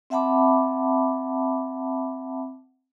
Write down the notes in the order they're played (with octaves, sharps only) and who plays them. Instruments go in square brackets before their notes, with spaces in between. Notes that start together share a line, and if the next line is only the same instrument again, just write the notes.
[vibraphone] C4 E5 F#5 A5 B5 D6